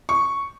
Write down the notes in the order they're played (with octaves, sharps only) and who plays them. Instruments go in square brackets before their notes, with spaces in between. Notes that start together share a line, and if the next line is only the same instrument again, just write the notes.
[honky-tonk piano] C#6